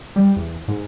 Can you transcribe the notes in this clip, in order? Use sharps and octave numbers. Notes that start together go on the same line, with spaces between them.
G3
E2
G#2